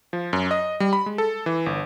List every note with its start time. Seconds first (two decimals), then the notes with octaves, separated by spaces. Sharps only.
0.13 F3
0.33 F#2
0.51 D#5
0.80 G3
0.93 B5
1.06 G#3
1.18 A4
1.46 E3
1.66 G1